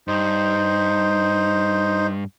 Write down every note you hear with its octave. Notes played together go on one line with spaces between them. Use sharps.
G2 D#4 C5